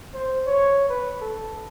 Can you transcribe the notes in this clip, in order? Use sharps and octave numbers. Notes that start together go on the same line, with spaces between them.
C5
C#5
B4
A4